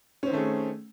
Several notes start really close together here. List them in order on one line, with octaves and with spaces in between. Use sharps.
C#4 C4 D#3 A3 G#4